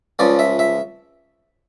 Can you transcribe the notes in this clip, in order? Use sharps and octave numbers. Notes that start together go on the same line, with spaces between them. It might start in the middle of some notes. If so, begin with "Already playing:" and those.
C#2 C#3 F3 D5
E5
E5